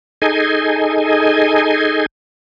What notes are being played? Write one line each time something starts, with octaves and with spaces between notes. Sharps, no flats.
D#4 G#4 A4 D#5 G#5